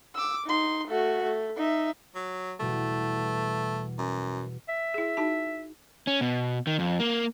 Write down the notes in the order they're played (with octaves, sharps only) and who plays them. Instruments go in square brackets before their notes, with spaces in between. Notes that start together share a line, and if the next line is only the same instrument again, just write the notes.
[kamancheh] D6 E6
D#4 C6
A3 F#4
A3
D#4 E5
[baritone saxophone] F#3
[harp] E2 B2 G3 [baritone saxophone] A3
[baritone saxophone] F#2
[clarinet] E5
[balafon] E4 G#4
D#4 F#4 A5
[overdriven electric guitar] C#4
B2
D#3
F2
A#3